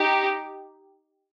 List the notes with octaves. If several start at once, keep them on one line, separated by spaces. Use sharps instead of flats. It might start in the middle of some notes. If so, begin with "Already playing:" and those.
Already playing: D#4 G4